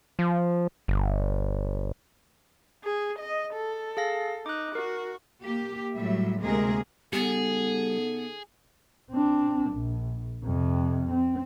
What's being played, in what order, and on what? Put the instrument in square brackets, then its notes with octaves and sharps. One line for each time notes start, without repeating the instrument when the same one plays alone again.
[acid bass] F3
G1
[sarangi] G#4
D#5
A4
[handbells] G#4 F5 A#6
[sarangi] D#4 [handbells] D6 F#6
[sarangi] F#4 [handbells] A#4
[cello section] A#3 G4
A2 F#3 G3 E5
D2 C3 G#3 A#3 G#4 A#4
[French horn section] C#3 D#4 A4 [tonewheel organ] G3 [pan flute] B3 [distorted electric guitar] G#4
[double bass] C4 D4
A#1
F2 C3
C4